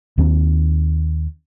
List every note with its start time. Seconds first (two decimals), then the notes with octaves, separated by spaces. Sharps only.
0.18 D#2 D#3 C4 D4